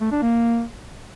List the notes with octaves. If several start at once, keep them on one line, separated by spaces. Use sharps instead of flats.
A3
D4
A#3